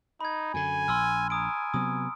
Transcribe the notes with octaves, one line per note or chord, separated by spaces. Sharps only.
D#4 B5 G#6
F#2 D3 G#5
A#1 C6 E6 F6
G#5 A#5 D#6 D7
C3 F#3 B3 D#6